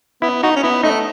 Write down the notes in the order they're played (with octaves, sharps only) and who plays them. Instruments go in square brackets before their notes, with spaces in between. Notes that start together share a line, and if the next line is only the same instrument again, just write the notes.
[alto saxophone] B3 [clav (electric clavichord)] E4
[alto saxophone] D#4 [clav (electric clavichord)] F#4
[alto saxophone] C#4
[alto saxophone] B3 [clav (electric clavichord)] E4
[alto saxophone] A3 [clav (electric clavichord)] D#4